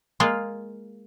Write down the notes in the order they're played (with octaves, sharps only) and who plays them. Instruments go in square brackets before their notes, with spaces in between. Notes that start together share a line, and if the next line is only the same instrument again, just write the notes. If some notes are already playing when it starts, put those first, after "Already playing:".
[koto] G#3 A#3 F4